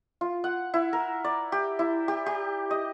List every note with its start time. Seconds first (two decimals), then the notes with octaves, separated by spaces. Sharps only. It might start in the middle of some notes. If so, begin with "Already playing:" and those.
0.21 F4
0.44 F#5
0.74 E4
0.93 A#4
1.24 D5
1.52 G4
1.79 E4
2.08 G4
2.26 G4
2.71 D#5